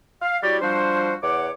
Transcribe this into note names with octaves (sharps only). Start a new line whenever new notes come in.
F5
G3 E4 F#4 G4 C#5 D5
F3 G3 D4 F#4 C5
E2 C#5 F#5 D6